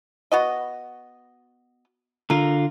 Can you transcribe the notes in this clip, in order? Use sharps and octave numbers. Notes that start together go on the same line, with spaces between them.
B3 F#4 D#5
D3 F4 A#4